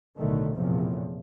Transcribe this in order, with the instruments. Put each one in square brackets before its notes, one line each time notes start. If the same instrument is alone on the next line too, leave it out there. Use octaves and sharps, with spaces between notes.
[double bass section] B1 A2 D3 D#3 A3
A#1 E2 A2 C3 F3